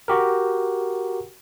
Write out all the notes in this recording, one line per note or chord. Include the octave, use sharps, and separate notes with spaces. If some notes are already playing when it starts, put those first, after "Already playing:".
F#4 G4 A#4